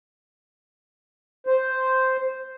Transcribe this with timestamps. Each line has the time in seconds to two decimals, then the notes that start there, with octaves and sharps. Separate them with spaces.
1.47 C5